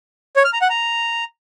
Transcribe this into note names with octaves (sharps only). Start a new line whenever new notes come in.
C#5
F6
A#5
F#5
A#5